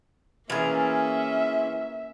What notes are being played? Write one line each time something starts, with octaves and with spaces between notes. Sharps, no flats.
E3 A#3 C#4 F4 G#4 A#4 E5